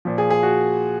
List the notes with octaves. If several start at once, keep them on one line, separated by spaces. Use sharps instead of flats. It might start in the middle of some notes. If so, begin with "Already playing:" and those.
A#2 F3
G#4
G#4
F#4